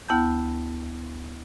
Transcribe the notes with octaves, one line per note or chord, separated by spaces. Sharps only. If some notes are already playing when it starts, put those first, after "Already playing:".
D2 B3 E4 G5 A5 G6